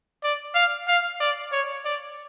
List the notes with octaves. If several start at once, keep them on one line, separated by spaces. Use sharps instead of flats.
D5
F5
F5
D5
C#5
D5